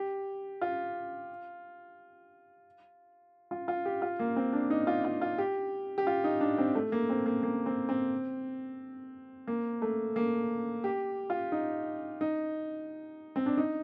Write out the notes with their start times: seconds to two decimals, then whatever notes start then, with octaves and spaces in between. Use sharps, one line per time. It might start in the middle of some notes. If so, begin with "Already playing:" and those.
Already playing: G4
0.61 F4
3.51 F4
3.68 F4
3.85 G4
4.02 F4
4.19 A#3
4.36 C4
4.53 D4
4.70 D#4
4.87 F4
5.05 F4
5.22 F4
5.38 G4
5.98 G4
6.07 F4
6.24 D#4
6.41 D4
6.58 C4
6.75 A3
6.92 A#3
7.10 C4
7.26 A#3
7.43 A#3
7.66 C4
7.89 C4
9.47 A#3
9.82 A3
10.16 A#3
10.84 G4
11.30 F4
11.52 D#4
12.21 D#4
13.36 C4
13.46 D4
13.57 D#4